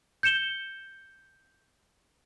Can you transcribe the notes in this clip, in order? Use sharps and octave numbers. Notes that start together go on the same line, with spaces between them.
G6 C#7 E7 G7